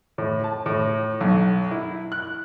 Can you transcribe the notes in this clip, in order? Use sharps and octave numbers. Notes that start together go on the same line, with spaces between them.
A2
A5
A2
B1
E4
F#6